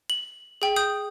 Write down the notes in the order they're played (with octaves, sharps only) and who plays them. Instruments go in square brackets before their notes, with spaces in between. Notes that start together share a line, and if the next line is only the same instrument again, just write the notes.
[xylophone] F#7
G#4 G5
D#6 G6